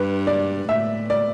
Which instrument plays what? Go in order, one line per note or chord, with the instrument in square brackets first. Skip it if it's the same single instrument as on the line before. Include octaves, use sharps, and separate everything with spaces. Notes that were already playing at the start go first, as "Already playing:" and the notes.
Already playing: [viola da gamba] G2 [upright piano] B4
[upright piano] D5
[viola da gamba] A2 [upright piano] E5
[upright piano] D5